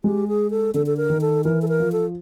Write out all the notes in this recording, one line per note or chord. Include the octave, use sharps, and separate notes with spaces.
G#3 G4
G#4
A4
D3 A4
A4
A#4
D#3
A4
E3 A#4
A4
A#4
F3
A4